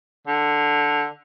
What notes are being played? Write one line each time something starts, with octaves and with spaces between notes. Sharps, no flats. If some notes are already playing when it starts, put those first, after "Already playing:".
D3